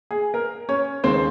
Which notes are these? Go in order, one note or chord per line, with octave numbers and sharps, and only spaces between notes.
G#4
A#4
C#4 C#5
D#2 C#3 G#3 C4 C5